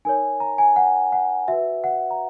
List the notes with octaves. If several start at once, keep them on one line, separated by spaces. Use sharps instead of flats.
D#4 A#4 C#5 G#5
A#5
G#5
F#5
F#5
F#4 B4 E5
F#5
A#5